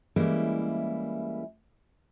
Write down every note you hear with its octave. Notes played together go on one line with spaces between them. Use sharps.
E3 G3 G#3 A#3 C#4 E4